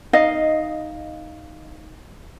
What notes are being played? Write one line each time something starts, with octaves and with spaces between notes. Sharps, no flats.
D#4 D#5 F5